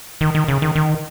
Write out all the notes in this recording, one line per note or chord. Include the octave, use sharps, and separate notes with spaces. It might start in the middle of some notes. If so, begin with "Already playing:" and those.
D#3
D#3
C#3
D#3
D#3